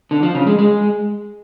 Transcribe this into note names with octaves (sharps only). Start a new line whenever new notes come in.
D3
F3
C#3
G#3
G#3